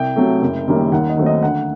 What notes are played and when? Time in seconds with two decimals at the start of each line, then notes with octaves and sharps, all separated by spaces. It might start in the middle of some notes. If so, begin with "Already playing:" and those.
Already playing: C2 G5
0.16 C3 F#3 A3
0.42 F#1
0.67 F#2 D#3 G3 A#3
0.92 D#2 F#5
1.09 D#5
1.17 D#3 F#3 A3 C4
1.26 D#5
1.43 D2 F#5